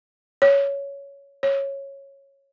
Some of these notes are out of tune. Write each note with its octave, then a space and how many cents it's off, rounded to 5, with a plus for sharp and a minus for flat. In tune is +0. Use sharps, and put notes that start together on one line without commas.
C#5 +10
C#5 -10